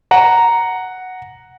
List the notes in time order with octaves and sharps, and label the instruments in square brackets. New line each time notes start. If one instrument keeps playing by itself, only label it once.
[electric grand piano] F#5 A#5